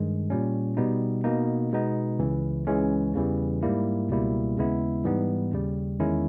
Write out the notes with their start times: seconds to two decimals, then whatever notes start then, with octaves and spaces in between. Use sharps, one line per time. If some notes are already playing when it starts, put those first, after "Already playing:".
Already playing: G2 D#3 G#3
0.30 A#2 G3 C#4
0.77 B2 G3 B3 D#4
1.24 B2 A#3 D#4
1.72 B2 G#3 B3 D#4
2.19 C#2 C#3 E3
2.67 C#2 C#3 E3 G#3 C#4
3.14 E2 C#3 E3 G3
3.63 G#2 G3 A#3 E4
4.09 C#2 B2 G3 A#3 E4
4.57 D#2 C#3 G#3 B3 E4
5.05 G#2 E3 G3 B3 D#4
5.52 D#2 C#3 G3
6.00 E2 D#3 G#3 C#4 E4